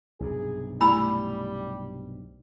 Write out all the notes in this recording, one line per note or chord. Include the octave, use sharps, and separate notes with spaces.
B1 G2 C3 G#4
G3 A3 E4 G#5 B5 E6